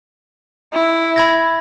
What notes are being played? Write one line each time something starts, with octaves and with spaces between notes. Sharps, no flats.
E4
B5 G#6 A#6